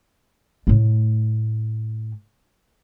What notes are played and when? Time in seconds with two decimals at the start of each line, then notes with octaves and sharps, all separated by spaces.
0.67 A2 A3